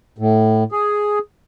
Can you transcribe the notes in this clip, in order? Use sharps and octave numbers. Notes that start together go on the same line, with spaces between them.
A2
G#4